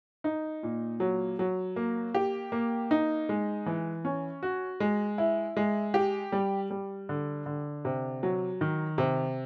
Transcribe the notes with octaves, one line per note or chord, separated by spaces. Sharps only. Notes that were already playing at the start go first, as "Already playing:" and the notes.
D#4
A#2
F#3
F#3
A#3
G4
A#3
D#4
G#3
E3
C#4
F#4
G#3
E4
G#3
G4
G3
G3
D3
D3
C3
F#3
D#3
C3